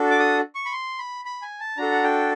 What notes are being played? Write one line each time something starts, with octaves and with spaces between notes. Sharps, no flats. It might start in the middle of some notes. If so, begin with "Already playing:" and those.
Already playing: D4 F#4 A4
D6
D#6
C#6
B5
C6
B5
B5
G#5
A5
D4 F#4 A4 A#5
F#5
G5